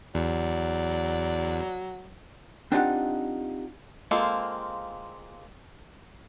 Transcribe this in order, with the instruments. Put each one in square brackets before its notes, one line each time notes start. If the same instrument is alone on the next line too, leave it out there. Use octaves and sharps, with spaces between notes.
[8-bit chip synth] E2 [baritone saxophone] F#3 [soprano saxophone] D5
[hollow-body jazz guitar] C4 D4 D#4 F4 G4 F#5
[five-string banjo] G#3 A#3 C4 F4 A4